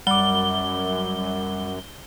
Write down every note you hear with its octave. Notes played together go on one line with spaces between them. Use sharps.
F#2 G3 F#5 D6 G7